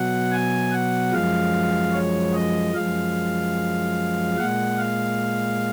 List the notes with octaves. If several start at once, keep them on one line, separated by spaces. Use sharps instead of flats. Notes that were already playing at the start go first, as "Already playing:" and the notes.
Already playing: B2 F#3 F#5
G#5
F#5
F#2 F3 G#3 F5
C#5
D#5
F#2 F3 G#3 F5
A#2 G#3 F#5
F5